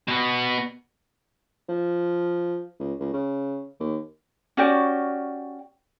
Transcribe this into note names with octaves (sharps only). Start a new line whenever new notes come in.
B2 B3
F3
C#2
C#2
C#3
D#2
C#4 F#4 G4 D5